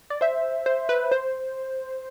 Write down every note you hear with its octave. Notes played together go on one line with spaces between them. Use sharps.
D5
C5 E5
C5
B4
C5